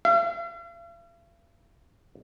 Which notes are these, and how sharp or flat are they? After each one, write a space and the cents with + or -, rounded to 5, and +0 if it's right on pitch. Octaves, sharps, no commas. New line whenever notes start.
F5 -45